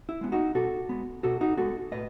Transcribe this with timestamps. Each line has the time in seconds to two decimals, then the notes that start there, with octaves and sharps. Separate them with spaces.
0.09 E4
0.21 G#3 B3
0.32 D#4 F#4
0.55 B2 F#4 A4
0.89 G#3 B3
1.23 B2 F#4 A4
1.41 D#4 F#4
1.57 G#3 B3 F#4 A4
1.92 A2 B4 D#5